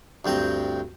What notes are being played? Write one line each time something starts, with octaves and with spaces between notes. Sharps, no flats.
D2 G2 C4 G5 A#5